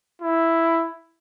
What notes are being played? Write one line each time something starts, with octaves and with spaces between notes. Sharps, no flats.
E4